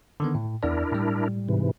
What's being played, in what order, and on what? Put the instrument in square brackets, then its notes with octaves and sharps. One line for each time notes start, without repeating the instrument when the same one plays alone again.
[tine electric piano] D3 D#3 B3
A2
[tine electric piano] E2 D5 [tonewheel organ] D4 E4 A#4
[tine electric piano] A2 G3
[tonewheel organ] G#2 C3 E3